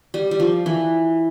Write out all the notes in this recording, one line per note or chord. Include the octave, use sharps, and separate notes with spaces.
G3
G3
F3
E3